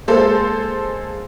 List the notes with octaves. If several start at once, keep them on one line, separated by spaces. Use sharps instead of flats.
G#3 A#3 A4 C5